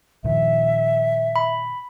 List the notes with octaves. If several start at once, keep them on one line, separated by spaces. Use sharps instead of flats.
A#2 D#3 F3 E5
B5